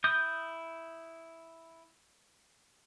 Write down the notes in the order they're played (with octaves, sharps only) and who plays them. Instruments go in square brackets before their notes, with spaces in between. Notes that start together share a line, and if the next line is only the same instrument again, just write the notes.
[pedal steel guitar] E4 D#6 G6